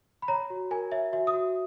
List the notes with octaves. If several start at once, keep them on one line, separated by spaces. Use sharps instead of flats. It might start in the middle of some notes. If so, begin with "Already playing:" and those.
B5
C#5 A#5
F#4
A#4 G#5
C#5 E5
F#4 E5
D#6
F#4